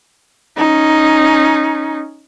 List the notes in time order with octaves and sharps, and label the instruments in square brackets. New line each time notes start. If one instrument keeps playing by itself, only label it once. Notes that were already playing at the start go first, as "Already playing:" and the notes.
[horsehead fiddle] C#4 D#4